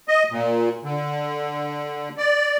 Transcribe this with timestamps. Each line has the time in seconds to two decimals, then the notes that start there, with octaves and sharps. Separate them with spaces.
0.08 D#5
0.32 A#2
0.84 D3
2.18 D5